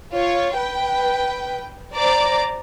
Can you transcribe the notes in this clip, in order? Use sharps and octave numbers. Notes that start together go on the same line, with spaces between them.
F4 C#5
B4 G5
C5 D5 A#5 D6